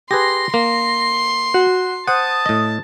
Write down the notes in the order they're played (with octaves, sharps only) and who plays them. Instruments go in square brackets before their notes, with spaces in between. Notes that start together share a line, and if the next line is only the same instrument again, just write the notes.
[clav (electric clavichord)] G4 G#4 B4 [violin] C6 [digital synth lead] A#6
[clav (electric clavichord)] A#3 [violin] C6
[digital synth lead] F#4
[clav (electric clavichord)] C5 F#5 [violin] A5 [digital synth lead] D#6
[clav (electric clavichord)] A2 D#5